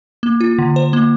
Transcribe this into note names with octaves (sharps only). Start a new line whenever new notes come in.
A#3
F4
D3
C5
A#3